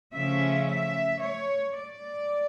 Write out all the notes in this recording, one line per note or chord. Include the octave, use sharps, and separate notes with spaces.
C#3 F3 A3 C#4 E5
E5
C#5
D5